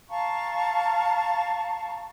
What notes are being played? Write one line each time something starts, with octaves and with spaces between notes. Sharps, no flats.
F5 A5 A#5 C#6